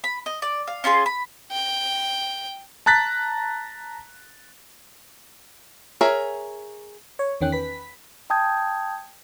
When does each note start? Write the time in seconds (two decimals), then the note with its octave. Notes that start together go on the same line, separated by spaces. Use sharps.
0.04 B5
0.26 D#5
0.42 D5
0.67 F5
0.84 C#4 F4 G#4 C6
1.06 B5
1.52 G5
2.86 A5 A#5 F#6 A6 B6
6.01 G#4 A#4 C#5 E5
7.19 C#5
7.41 E2 D#3 C#4 G5 F#6
7.52 B4 B6
8.30 G5 A5 D#6 G6 G#6